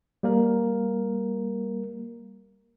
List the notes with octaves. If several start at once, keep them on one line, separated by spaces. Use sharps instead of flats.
G3 A#3 A#4